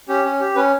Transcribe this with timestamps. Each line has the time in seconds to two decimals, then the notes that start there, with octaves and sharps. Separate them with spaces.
0.09 C#4 G4
0.25 C#4
0.40 G4
0.55 C#4 B4